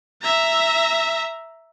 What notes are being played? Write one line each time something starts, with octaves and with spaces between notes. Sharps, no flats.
E5 A#5